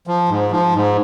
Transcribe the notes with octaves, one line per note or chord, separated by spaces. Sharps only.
F3
G#2
F3
G#2